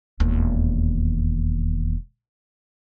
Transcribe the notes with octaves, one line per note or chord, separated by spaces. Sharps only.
E1 D#2